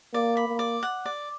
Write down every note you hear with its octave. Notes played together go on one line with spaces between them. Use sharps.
A#3 D5
B5
A#3
D5
F#5
D5